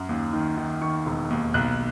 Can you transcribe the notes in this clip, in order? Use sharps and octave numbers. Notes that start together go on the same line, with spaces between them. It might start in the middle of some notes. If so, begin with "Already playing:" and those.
Already playing: F#2
D#2
D#3
D#3
D#3 C#6
E1
D#2
B1 F#6